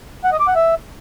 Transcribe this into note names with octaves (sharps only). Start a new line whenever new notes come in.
F#5
D#5
D6
F#5
E5